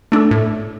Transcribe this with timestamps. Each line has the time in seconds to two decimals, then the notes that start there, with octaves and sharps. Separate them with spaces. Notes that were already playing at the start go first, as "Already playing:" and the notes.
0.12 A3 D4 A4
0.31 A2